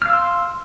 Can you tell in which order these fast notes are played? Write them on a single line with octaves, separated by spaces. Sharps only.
F6 F5 E6 C6